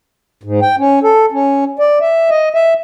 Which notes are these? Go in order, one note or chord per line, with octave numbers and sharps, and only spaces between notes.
G#2
G5
C#4
A4
C#4
D5
E5
D#5
E5